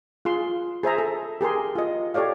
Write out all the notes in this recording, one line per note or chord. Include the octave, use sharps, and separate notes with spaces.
F4 G#4 C6
G#4 C5 E5 A#5
A4
G4 G#4 A#4 C6
F4 D#5
G4 A4 C#5 D5 F5